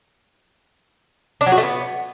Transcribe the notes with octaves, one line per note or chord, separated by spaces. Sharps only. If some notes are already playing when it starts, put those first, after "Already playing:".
D4
F#3
F#4
A3
B3